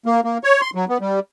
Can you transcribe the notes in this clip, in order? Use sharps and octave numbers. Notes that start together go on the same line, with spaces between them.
A#3
A#3
C#5
C6
F#3
B3
G3